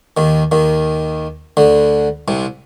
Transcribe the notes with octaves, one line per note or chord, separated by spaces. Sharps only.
D#2 D#3
D#2 D#3
D2 D3
C2 C3